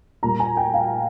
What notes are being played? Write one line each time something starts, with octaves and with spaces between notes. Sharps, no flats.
A#2 G3 A#3 A#5
G#5
G5
F5